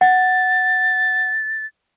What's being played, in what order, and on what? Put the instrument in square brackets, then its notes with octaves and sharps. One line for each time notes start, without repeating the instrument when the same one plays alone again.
[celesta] F#5 [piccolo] A6